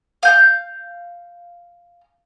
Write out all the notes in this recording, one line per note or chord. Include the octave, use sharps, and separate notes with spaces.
F5 G6